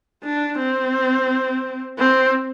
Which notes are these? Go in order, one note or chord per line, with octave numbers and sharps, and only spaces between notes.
D4
C4
C4